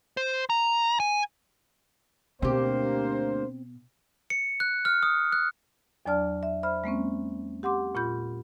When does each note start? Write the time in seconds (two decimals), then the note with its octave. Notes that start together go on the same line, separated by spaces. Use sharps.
0.17 C5
0.50 A#5
1.00 G#5
2.42 D2 B2 A#3 C4 G4 C5
4.30 C#7
4.60 F#6
4.85 F6
5.03 D#6
5.32 F#6
6.06 E2 F#3 D4 D5 A5 F6
6.43 E5
6.63 C5 E5 B5 F6
6.84 G#3 A#3 C4 C#4
7.63 G4 F#5 C6 D6
7.95 A#2 F4 B5 G6